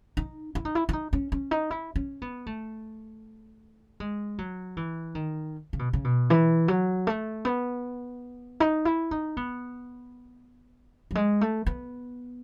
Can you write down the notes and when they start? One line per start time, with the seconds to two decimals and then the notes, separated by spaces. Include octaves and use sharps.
0.17 D#4
0.55 E4
0.65 D#4
0.75 E4
0.89 E4
0.93 D#4
1.13 C#4
1.32 C#4
1.51 D#4
1.70 E4
1.96 C#4
2.22 B3
2.46 A3
4.00 G#3
4.38 F#3
4.77 E3
5.15 D#3
5.73 C#3
5.79 B2
5.93 C#3
6.04 B2
6.30 E3
6.68 F#3
7.07 A3
7.45 B3
8.60 D#4
8.85 E4
9.11 D#4
9.37 B3
11.11 F#3
11.15 G#3
11.41 A3
11.66 B3